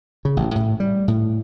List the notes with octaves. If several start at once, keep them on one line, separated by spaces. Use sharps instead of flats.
C#3
A1
A2
G3
A2